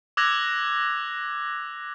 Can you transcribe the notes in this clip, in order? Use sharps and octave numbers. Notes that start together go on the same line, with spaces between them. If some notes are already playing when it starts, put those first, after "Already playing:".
D6 E6 F#6 G#6 A#6 F7